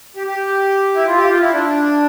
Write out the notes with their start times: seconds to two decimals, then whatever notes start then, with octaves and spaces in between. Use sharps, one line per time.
0.16 G4
0.27 G4
0.95 E4
1.07 F4
1.18 G4
1.29 F4
1.41 E4
1.52 D4